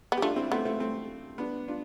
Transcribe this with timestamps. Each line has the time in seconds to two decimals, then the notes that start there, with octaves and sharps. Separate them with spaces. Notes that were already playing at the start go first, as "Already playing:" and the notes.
0.12 B3
0.17 G4
0.22 A3 D4 F4
0.36 C4 E4
0.51 A3 B3 C4
0.65 A3 C4
0.80 A3 C4
1.38 B3 D4
1.68 D4 F4